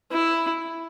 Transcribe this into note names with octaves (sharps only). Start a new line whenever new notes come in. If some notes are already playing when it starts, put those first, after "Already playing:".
E4